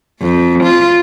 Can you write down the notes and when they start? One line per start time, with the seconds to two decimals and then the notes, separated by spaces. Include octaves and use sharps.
0.21 F2
0.64 F4